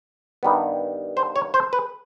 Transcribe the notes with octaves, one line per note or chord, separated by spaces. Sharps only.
G2 D#3 G3 B3
C5
C#5
C5
B4